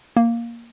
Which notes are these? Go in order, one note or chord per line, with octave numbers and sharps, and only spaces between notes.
A#3